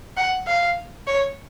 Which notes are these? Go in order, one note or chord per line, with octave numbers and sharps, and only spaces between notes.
F#5
F5
C#5